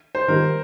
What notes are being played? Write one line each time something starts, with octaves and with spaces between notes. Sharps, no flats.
C5
D#3 G3 A#3 D#4 A#4